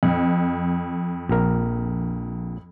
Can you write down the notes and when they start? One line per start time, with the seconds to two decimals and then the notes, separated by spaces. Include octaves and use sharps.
0.03 F2
1.29 A#1 A#4